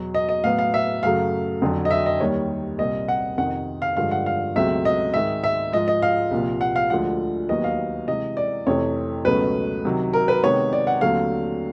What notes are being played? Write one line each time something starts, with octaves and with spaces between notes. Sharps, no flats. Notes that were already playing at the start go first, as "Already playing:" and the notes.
Already playing: E2 B2 F#3
D#5
D#5
A2 F#3 B3 F5
F5
E5
F#2 C#3 F#3 A3 F5
F2 D3 F#3
D#5
E5
D#5
D#2 D#3 G3 C#5
C2 A#2 G3 C4 D#5
F#5
F2 C3 D#3 F#5
F5
G2 D3 F3 G#3 F5
F#5
F5
C#2 B2 F#3 A3 C4 E5
D#5
G#2 D#3 G#3 E5
E5
G#2 F3 G#3 D#5
D#5
F5
C2 A#2 F3
F#5
F5
D2 D3 F3 G#3 F#5
D#2 D#3 F#3 B3 D#5
F5
C3 E3 G#3 D#5
D5
F2 C3 E3 A3 C#5
C#2 B2 F#3 A3 C#4 B4
C3 D#3 F#3
A#4
B4
C3 D#3 G#3 B3 C#5
D5
F#5
D#2 D3 F#3 A3 C4 F5